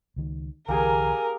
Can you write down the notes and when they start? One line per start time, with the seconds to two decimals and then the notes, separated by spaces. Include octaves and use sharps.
0.16 C#2 D#3
0.68 C2 D3 E3 A#3 G4 G#4 A#4 G#5